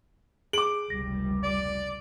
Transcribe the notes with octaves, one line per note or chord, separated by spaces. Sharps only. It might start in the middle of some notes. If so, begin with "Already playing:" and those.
G#4 D6 D7 F#7
F1 C#2 G3 A#6
D5